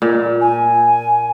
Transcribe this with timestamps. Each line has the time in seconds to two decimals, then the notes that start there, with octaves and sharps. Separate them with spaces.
0.02 A#2
0.41 G#5